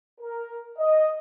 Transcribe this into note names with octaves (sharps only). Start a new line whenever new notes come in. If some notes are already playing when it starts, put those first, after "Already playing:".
A#4
D#5